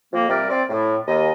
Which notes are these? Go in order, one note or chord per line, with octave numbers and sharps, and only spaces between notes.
F2 A#3
C3 G3 A#4 D5
C4 D5
A2
D#2 D#5